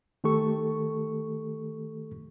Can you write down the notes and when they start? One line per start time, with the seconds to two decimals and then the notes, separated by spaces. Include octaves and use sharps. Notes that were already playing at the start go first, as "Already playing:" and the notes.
0.24 D#3 A3 G4 A4 C#6